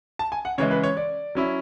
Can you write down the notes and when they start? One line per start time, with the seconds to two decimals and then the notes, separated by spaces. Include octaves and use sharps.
0.19 A5
0.32 G#5
0.45 F#5
0.58 C#3 E3 G#3 C#5
0.71 B4
0.84 C#5
0.97 D5
1.35 F#3 C#4 E4